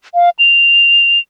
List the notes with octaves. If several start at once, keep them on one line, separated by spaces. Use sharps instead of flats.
F5
F7